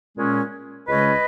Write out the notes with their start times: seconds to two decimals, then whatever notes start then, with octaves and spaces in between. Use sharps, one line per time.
0.17 A#2 G#3 C#4
0.88 C#2 C#3 G#3 C#4 B4 D#5